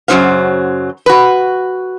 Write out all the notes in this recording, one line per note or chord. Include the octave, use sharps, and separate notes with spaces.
F#2 C#3 F#3 C#4 C5 F5
F#4 B4